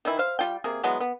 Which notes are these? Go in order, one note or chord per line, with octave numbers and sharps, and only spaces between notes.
D#3 E3 E4
C5 F5
G3 F4 G5
C3 A#3 G#4
E3 F#3 G#3 B3
B3